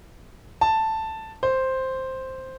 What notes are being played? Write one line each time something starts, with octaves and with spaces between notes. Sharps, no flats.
A5
C5